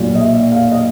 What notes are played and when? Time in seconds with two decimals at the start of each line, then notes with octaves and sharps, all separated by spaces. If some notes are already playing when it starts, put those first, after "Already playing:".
Already playing: B1 A#2 F#3
0.15 D#5
0.20 E5
0.52 F5
0.72 D#5